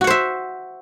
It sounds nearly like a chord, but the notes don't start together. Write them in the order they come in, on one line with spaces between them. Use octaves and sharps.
F#4 F#5 C5 E5